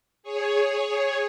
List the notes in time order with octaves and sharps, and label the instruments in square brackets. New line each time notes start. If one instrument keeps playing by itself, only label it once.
[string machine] G#4 C#5